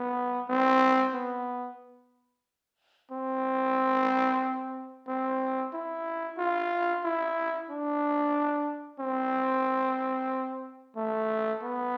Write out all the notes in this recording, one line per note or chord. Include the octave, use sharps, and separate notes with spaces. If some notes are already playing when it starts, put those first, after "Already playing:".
Already playing: B3
C4
B3
C4
C4
E4
F4
E4
D4
C4
A3
B3